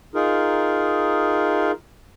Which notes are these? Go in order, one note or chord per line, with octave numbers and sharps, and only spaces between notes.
D#4 F4 G#4 A#4